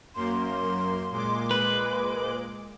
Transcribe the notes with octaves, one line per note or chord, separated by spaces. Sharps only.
F#2 A#3 C6
A#2 G#3 D6
B4